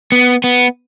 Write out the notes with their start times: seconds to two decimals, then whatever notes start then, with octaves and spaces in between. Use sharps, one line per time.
0.12 B3
0.44 B3